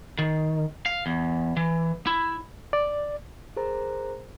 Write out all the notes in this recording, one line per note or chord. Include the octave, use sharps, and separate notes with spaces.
D#3
F5
E2
E3
E4
D5
G#4 A#4 C5 A#5